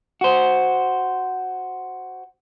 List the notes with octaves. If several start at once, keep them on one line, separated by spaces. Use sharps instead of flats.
F#4 C5